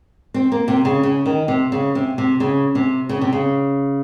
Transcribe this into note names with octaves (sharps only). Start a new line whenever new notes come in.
C4
A#3
C3
C#3
C#3
D#3
C3
C#3
C3
C3
C#3
C3
C#3
C3
C#3